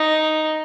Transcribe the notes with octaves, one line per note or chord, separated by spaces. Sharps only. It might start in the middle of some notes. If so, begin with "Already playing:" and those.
Already playing: D#4